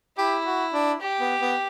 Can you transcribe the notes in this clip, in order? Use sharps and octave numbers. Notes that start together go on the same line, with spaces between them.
E4 G4
F#4
D4
G4
B3
B3